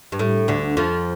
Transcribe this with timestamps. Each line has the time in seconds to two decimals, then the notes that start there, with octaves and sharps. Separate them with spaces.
0.12 G2
0.19 A2
0.48 D2 D3
0.77 F2 F3